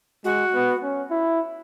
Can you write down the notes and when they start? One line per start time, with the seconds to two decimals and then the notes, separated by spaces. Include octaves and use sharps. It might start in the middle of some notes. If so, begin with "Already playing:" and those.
0.24 G#3 F#4
0.54 B3
0.83 C#4
1.10 E4